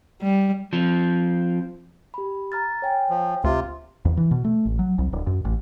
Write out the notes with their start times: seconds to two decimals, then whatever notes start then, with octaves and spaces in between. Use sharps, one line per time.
0.22 G3
0.73 F3 C4
2.14 G4 B5
2.52 A#5 F6 A6
2.82 C#5 G5 G#5
3.10 F3
3.44 D2 C3 F4
4.05 E2
4.17 E3
4.31 B2
4.44 A3
4.65 A1
4.79 F#3
4.99 C2
5.13 D1
5.27 F#2
5.45 A1